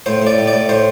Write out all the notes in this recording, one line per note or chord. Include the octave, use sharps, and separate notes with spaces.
A2 C5
A2 D5
A2
D5
A2
A2 C5